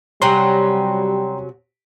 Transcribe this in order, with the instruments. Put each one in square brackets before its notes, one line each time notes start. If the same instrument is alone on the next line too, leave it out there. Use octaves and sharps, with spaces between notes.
[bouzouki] C3 F#3 C#4 [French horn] G3 [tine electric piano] G5 A#5 C6